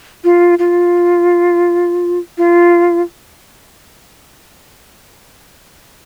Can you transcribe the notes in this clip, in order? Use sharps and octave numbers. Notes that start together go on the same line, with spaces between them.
F4
F4
F4